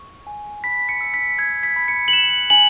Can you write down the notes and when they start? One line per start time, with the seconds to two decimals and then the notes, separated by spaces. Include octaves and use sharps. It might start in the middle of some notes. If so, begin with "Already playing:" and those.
Already playing: C#6
0.27 G#5
0.64 B5 B6
0.89 C#7
1.01 E6
1.14 B6
1.38 E6 G#6
1.63 B6
1.76 B5
1.88 C#7
2.08 F#7
2.13 F#6 E7
2.50 G#5 F#7